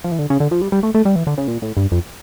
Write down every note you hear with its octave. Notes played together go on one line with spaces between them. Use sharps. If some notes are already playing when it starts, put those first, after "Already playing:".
F3
E3
D3
C#3
D3
F3
G3
G3
A3
A3
G3
E3
D3
C#3
A#2
A2
G2
F2